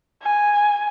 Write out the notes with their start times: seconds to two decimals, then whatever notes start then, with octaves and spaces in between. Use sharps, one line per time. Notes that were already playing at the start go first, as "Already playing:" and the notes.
0.23 G#5